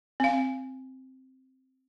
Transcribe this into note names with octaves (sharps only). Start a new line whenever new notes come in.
C4 F5